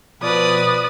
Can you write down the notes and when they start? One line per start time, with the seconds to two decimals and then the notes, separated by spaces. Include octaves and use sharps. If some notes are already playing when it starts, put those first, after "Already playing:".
0.23 B2 F3 B4 D5 D#6